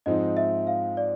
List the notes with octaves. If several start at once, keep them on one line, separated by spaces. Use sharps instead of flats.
G#2 F3 G#3 C4 D#4 D#5
E5
F5
D5